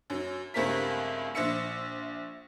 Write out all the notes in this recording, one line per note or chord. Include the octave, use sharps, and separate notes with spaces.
F#2 F#3
C#2 G2 A3 C4 A#4 B6
A#1 C5 E5 E6 C#7